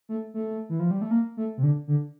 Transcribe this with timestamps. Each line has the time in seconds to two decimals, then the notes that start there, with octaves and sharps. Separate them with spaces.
0.09 A3
0.34 A3
0.69 E3
0.80 F3
0.91 G3
1.02 A3
1.11 A#3
1.37 A3
1.57 C3
1.63 D3
1.87 D3